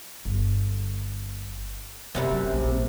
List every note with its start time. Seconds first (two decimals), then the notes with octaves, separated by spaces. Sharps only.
0.25 G1
2.15 F#2 C3 D#3 G3 B3
2.32 F#3
2.53 A#1